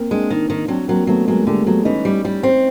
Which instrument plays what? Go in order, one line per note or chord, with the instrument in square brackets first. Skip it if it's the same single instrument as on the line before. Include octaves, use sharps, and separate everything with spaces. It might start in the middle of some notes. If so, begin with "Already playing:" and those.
Already playing: [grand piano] A#3 C4
[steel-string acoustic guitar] G#3 [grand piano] C4 D4
[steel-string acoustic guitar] D#3
D#3
[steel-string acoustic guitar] F#3 [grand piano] C4 D4
[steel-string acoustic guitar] F#3 [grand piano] A#3 C4
[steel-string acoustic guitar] F#3 [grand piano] A3 B3
[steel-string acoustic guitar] F#3 [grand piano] G#3 A#3
[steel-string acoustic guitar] D3 [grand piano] G3 A3
[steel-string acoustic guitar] F#3 [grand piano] A3 B3
[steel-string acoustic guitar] E3 [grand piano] C#4 D#4
[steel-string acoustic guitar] G3
G3
C4